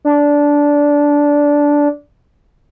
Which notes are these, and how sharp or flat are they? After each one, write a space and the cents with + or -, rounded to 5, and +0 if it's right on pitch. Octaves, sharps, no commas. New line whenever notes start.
D4 -10